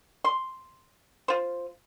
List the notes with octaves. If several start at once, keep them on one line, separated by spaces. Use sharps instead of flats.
C6
F4 C5